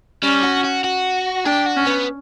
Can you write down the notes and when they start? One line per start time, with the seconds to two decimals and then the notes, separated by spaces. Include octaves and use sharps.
0.23 G3 C#4
0.43 F#4
0.65 F#4
0.84 F#4
1.45 D4 G4
1.66 F#4
1.77 C#4
1.86 B3